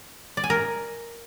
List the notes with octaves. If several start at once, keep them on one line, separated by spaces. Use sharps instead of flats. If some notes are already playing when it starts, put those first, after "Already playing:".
D5
G#5
A#4